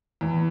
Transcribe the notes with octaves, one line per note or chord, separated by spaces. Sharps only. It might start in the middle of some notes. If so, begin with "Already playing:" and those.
E2